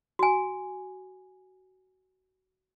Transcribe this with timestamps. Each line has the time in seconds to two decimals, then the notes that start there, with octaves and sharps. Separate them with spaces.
0.19 F#4 G#5